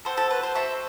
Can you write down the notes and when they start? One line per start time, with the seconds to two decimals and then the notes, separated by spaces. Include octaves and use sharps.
0.05 C4 F#4 A4 C5
0.17 A4
0.31 B4
0.43 C5
0.55 C4 F#4 A4 E5